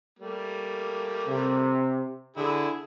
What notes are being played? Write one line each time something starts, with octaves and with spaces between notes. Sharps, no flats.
G3 A3 A#3
C3
D3 E4 G#4